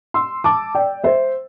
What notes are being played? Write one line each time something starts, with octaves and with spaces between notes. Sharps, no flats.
C6 E6
A5 D6
D5 G5
C5 E5